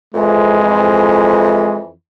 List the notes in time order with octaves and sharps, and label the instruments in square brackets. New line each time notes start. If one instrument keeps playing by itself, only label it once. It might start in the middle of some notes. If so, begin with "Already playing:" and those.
[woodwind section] F2 E3 [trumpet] G#3